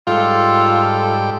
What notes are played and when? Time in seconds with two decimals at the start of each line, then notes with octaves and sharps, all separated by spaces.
0.07 G#2 G3 F4 A4 G5